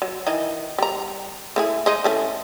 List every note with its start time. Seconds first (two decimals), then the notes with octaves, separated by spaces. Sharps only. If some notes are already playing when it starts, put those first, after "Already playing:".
0.02 F#3
0.26 D#3 E3 D#4
0.78 G3 A#5
1.56 A3 E4 G#4
1.86 G#3 D#4
2.04 E3 A3 C#4